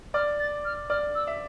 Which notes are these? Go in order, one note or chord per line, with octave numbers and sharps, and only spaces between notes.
D5 F6
A6
F6
D5 F6
E6
E5